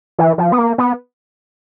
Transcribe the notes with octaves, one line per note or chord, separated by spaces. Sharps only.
E3
F3
B3
A#3
B3